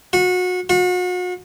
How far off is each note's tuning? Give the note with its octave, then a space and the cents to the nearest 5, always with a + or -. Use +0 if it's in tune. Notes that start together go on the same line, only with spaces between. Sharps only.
F#4 -30
F#4 -40